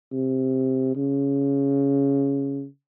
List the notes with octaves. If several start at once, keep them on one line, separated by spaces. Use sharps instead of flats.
C3
C#3